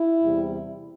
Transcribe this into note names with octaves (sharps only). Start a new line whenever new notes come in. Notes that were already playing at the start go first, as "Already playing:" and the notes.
Already playing: E4
E2 C3 G3